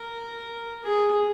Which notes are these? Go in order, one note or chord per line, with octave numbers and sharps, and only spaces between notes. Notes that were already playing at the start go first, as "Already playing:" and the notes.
Already playing: A#4
G#4